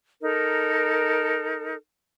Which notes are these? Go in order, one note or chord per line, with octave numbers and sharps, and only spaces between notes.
D#4 A4 A#4